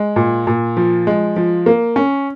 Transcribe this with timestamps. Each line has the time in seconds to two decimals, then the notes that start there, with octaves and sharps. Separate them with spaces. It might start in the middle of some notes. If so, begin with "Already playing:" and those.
Already playing: G#3
0.16 A#2
0.47 A#2
0.77 F3
1.07 G#3
1.36 F3
1.66 A#3
1.96 C#4